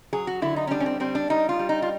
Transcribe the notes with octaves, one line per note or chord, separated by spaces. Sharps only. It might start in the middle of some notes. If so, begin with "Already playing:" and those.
F#3 G#4
F#4
D3 E4
D#4
C#4
G3 D4
C#4
C4
G3 C4
D4
G3 D#4
F4
G3
D#4
F4